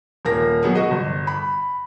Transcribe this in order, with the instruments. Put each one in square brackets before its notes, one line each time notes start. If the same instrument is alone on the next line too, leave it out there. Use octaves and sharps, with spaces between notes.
[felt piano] D#1 A#3 A#4 A#6
F#3 B3 G#4
F#4 D#5
G1
B5